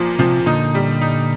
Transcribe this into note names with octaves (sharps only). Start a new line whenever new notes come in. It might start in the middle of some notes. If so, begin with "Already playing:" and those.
Already playing: A#2 F3
C3 F3
A#2 D3 D#4
G3
D#4